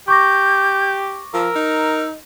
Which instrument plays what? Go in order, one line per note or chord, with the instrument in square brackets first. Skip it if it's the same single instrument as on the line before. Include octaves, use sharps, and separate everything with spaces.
[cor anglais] G4 [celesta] C#6 D6 A#6 [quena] G6
[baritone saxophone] F3 [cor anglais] A#4 [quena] E6
[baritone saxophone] D#4